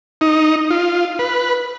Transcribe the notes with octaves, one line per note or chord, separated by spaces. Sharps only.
D#4
F4
B4